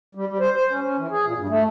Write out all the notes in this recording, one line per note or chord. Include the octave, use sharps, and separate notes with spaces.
G3
G3
C5
C5
C#4
C#4
E3
G#4
A#2
G2
A3